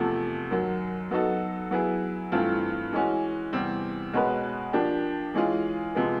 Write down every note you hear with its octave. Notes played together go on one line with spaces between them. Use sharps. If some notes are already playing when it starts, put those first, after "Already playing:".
Already playing: E2 C3 F3 A3
F#2 D#3 F#3
F#3 B3 D#4 F#4 A4
F#3 B3 E4 G#4
G2 E3 A3 C4 F4
E3 G#3 C#4 F#4
E2 C3 E3 G3 C4
B2 G#3 C#4 F#4 B4
F3 A#3 D4 G4
E3 G#3 C#4 F4 G#4
C3 F3 G#3 B3